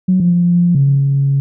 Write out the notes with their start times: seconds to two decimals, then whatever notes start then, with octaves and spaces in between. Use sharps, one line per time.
0.08 F#3
0.20 F3
0.75 C#3